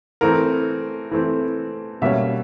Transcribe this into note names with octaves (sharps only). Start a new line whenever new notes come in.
E3 A3 C4 A#4
E3 A3 C4
B2 G3 A#3 C#4 E5